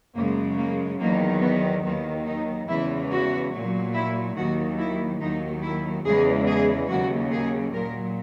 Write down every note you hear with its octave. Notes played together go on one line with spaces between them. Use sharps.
F#2 C#3 G#3 A#3
A#3
E2 D#3 F#3 A#3
B3
D#2 D#3 F#3 B3
D#4
E2 C#3 E3 G#3 E4
F#4
A#2 F#3
E4
D#2 D#3 F#3 F#4
E4
D#2 D#3 F#3 D#4
E4
E2 C#3 E3 G#3 G#4
G#4
D#2 C#3 F#3 F#4
G#4
A#2 F#3 A#4